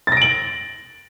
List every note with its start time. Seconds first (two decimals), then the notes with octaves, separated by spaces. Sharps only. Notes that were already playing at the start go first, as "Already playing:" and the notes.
0.07 A6
0.12 A#6
0.17 D7
0.22 F#7